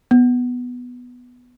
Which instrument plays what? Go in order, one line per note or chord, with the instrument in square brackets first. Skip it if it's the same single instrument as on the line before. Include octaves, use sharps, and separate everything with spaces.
[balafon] B3